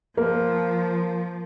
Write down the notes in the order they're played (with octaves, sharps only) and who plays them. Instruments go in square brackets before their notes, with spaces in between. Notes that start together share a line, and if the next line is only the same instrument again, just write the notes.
[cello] F3 [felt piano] A#3